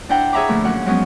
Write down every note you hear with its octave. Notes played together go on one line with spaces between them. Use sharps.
D4 E4 C5 F#5 G5 A#5
G#4 C#5 E5 A#5 B5 D6
A#2 D3 F3 A3
F#2 A#2 C#4 F#5
F3 F#3 G#3 B3 C#4